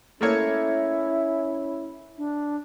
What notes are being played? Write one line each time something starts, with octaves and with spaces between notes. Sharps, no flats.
A3 A#3 C#4 E4 C#5
D4